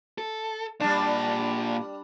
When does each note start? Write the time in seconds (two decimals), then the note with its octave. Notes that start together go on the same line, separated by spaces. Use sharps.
0.18 A4
0.80 A#2 G3 D4 A5